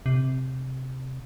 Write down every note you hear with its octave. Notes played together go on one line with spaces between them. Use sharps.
C3